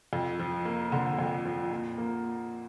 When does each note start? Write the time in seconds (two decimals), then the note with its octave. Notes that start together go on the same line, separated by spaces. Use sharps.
0.13 F2
0.39 F3
0.65 A#3
0.92 D3
1.19 F2
1.45 F3
1.71 A#2
1.98 A#3